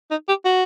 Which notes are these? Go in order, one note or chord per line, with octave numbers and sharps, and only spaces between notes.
D#4
G4
F#4